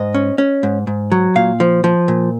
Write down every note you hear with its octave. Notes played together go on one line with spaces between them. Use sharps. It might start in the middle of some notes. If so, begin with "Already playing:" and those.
Already playing: G#2 D#5
C#4
C#4
G#2
G#2
F#3
A#2 F5
F3
F3
A#2